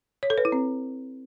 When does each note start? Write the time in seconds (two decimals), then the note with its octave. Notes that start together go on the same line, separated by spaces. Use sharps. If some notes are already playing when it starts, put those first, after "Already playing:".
0.23 C#5
0.30 A4
0.38 B4
0.45 E4
0.52 C4